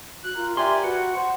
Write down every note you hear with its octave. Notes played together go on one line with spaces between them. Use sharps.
F#4 F#6
F4 A#4
G4 D5 E5 G#5 C6
F#4 B4 F#5
C#6
C5 F#5